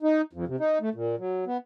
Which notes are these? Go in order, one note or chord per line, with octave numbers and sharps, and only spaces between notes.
D#4
F2
C3
D#4
A3
A#2
F#3
B3